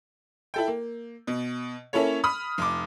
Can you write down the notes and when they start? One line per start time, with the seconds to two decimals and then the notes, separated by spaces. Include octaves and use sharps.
0.54 E4 A4 G5
0.68 A#3
1.27 B2
1.93 A#3 C#4 E4 A4 C#5
2.24 B5 D#6 F6
2.58 F1 D6